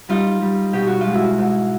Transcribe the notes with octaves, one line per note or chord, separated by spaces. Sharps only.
G3 D#4 F4
G3
B2 G4
F#4
F4
G#3
E4 F#4
G#2